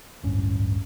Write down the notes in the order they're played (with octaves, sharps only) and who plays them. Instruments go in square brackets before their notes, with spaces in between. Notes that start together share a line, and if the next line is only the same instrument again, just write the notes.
[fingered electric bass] D1 A1 G2 C#4